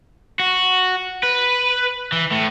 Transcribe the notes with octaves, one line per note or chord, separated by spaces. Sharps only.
F#4
B4
E3
A2